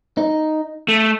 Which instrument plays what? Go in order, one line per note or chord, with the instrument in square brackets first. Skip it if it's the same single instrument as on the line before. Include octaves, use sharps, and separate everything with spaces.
[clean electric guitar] D#4
[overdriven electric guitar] A3